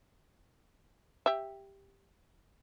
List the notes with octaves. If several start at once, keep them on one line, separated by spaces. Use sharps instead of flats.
G4 E5